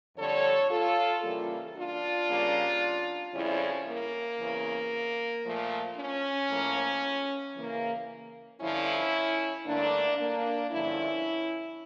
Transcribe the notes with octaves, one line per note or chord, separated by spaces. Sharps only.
F2 D3 G3 A4 C#5
F4 A4
C#3 E3 G3 A#3
D4 F4
C#3 G3 A#3
F2 C#3 G3 C#4 E4
A#3
E2 C#3 E3
A#2 F3 A3
C#4
A2 F3 A#3
C#3 E3 A#3
G2 D3 F3 C#4 E4
G2 D3 A3 A#3 D4
A#3 D4
G2 D3 F3 C#4 E4